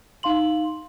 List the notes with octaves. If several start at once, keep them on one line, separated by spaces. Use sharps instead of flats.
D#4 F5 C6 F#7